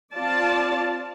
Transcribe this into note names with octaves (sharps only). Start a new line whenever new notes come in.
C4 F4 D5 A5